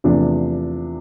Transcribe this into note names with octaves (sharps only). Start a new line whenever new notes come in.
E2 C3 F3 A3 D4